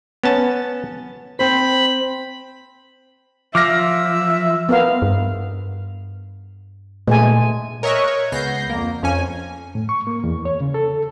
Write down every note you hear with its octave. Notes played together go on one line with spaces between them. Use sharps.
B3 C#4 A5
C4 C5 B5
F3 E5 D6 F6 A#6
B3 A#4 F5
G2
A#2 G#3 A3 G#5
A#4 C#5 D#5 E5 C#6 F#6
C#5
C#2 B3 G6 A#6 C7
F2 A#3
F2 C#4 G#5
A2
C#6
A#3
E2
C#5
C#3
A4